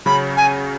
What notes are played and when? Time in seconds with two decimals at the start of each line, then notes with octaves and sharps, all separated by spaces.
0.06 C#3 F#3 C#4 B5
0.37 G#5